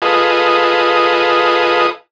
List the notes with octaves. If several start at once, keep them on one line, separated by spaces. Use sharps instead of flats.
F4 G#4 A4 B4 D#5